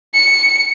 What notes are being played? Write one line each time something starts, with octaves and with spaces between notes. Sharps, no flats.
C#7